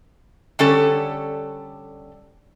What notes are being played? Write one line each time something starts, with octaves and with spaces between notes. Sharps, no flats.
D3 G3 C#4 A4